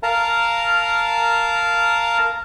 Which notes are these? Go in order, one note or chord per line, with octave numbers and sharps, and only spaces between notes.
A#4 F5 A5 A#5